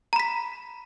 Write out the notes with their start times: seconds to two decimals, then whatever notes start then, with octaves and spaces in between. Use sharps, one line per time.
0.13 A#5
0.16 B5
0.20 B6